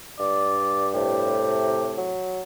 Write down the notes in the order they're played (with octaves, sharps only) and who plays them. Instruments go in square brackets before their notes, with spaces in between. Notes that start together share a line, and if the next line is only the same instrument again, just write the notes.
[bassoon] G2 [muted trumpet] D5
[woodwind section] A2 C3 [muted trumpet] G4
[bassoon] F#3